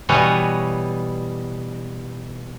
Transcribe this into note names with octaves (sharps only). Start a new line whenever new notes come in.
B2 E3 G3 B4 C#5 D#5